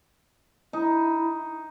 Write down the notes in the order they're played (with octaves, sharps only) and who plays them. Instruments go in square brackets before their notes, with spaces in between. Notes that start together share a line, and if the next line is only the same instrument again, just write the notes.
[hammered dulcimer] D#4 [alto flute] E4